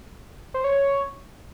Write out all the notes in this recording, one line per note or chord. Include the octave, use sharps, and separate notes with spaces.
C5
C#5